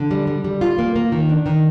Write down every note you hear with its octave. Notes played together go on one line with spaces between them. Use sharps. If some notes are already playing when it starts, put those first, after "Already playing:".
Already playing: D3
G3
G3
G3
F4
A#3
A#3
D#3
D4
D#3